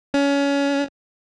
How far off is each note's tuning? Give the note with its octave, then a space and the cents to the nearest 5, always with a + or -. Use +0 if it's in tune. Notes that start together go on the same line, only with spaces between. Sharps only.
C#4 +25